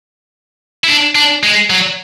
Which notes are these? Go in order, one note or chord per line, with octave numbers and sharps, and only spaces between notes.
E4
D4
D4
G#3
F#3